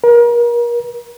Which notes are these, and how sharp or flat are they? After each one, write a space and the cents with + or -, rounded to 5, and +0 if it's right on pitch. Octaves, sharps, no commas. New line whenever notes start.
A#4 +35